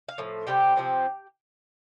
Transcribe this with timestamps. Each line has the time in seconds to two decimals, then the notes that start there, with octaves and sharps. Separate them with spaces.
0.09 F5
0.18 A2 F3
0.47 C3 G3 C4 G4 G5
0.76 C3 F3 A3 C4